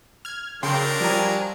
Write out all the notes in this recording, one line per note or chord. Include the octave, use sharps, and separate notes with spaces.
F6 G#6
C#3 F#3 D4 A#4 G5 C6
F3 G3 G#5 A#5